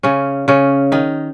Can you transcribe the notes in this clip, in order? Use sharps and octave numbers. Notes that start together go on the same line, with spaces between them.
C#3 C#4
C#3 C#4
D#3 D#4